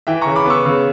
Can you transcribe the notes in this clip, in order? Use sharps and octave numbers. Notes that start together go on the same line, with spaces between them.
E3 E5 G5
C#3 A#5 C#6
B5 D6
B3 C#6 E6
C#3